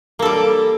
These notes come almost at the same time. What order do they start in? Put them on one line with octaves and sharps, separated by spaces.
A#3 A4 G3